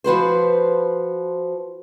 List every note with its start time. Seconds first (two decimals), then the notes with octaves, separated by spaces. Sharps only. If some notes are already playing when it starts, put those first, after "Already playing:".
0.04 F3 F#4 B4 C5